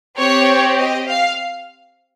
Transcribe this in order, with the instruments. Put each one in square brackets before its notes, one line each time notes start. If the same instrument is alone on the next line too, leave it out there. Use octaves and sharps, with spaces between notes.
[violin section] C4 G4 C#5
D#5
F5